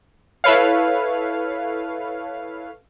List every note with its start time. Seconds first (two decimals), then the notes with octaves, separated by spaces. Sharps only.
0.44 E4 A4 B4 C#5 F5